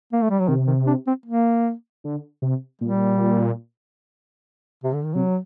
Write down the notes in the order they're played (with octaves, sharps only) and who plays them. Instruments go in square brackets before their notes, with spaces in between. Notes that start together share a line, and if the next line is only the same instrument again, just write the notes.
[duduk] A#3
A3
G3
F#3
[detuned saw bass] C3 [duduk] D#3
[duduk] D#3
D4
C4
A#3
[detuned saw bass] D3
C3
[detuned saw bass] A#2 [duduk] G3
[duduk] C3
D3
D#3
[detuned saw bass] C3 [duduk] F#3